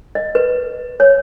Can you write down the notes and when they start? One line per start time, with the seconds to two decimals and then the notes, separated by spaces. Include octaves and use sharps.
0.15 D#5
0.35 B4
1.00 C#5